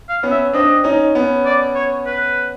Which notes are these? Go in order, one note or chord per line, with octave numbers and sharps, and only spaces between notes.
F5
B3 C#4
E5
C4 D4 D#5
C#4 D#4
B3 C#4
D5
C#5
B4